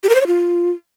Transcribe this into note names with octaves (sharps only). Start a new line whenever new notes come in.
G4
A#4
C5
C#5
F4